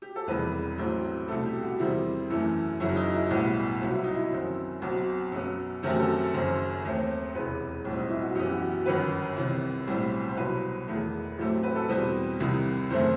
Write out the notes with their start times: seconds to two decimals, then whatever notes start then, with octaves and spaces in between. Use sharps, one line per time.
0.02 G4
0.16 A4
0.27 E1 E2 C3 D#3 G3 B4
0.78 A1 A2 F#3 A3 C4
1.28 C2 B2 A3 A4
1.45 G4
1.62 F#4
1.79 E2 C3 D#3 G3 C4 E4
2.30 F#2 E3 A3
2.80 F#1 F#2 F#3 E4
2.96 D#4
3.14 E4
3.31 B1 A2 G3 B3
3.81 C2 C3 F#3 B3 F#4
3.92 E4
4.03 D#4
4.14 E4
4.32 F#2 D#3 F#3 C4
4.82 B1 B2 F#3 C4 F#4
5.32 F#2 F#3 B3
5.83 F#2 D#3 F#3 A3 C4 G4
6.00 A4
6.34 F#1 F#2 D#3 F#3 C5
6.85 D#2 D#3 A3 C4
7.35 E1 E2 C3 B4
7.85 B1 A2 G3 C4
7.98 D#4
8.10 E4
8.22 F#4
8.35 F#2 E3 B3 G4
8.52 F#4
8.69 F#4
8.86 G1 F#2 D#3 B4
9.37 C2 C3 D#3
9.87 B1 A2 G3 C4
10.28 C5
10.37 C2 B2 F#3 C4 B4
10.88 E1 E2 D#3 A3
11.38 A1 A2 F#3 A3 C4 G4
11.63 B4
11.76 A4
11.89 E2 B2 G3 C4 B4
12.39 C2 C3 D#3 G3
12.90 F#1 F#2 D#3 A3 C4 C5